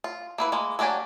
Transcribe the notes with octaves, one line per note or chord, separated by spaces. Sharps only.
F4
A#3 E4 B4
G#3 A#3
F#3 A#3 D4 G4 G#5